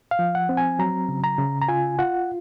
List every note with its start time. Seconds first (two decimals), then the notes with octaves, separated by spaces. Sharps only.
0.11 F5
0.19 F3
0.35 F#5
0.49 C4
0.57 G#5
0.79 F#3 A#5
1.09 C#3
1.24 A#5
1.38 C#3
1.62 A#5
1.68 F4 G#5
1.99 F4 F#5